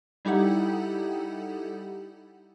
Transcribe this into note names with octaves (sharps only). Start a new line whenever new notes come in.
G3 D#4 E4 G4 A4 F#5